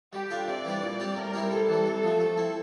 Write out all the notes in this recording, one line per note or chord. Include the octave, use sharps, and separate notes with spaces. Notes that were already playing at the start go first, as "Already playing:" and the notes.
G3 G4
D4 F4 A4
C3 D5
E3 G3 D4
A#2
G3 C4 G4
A2 A#4
G3 C4 E4 G4
C3 A4
E3 G3
C3
F3 A3
A3
C4 E4